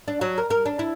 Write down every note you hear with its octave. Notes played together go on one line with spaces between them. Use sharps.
D4
F#3
A#4
A#4
D4
E4